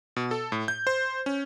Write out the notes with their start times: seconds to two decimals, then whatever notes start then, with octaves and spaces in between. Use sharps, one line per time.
0.16 B2
0.31 A4
0.52 A2
0.68 G6
0.87 C5
1.26 C#4